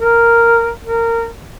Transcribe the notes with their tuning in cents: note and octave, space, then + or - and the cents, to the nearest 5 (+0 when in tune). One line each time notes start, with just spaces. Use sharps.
A#4 -5
A#4 -20